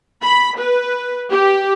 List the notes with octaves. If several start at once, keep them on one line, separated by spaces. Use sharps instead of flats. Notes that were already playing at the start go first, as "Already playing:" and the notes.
B5
B4
G4